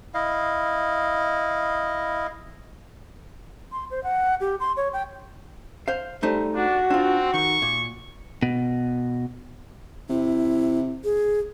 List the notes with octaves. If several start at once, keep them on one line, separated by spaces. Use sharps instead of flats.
E4 D#5 F5
C6
C5
F#5
G4
C6
C#5
G5
C5 F5
G3 A3 D#4 C5
D4 F#4
C4 D4 F4
D#3 C#6
A#2
B2
C3 E4
G#4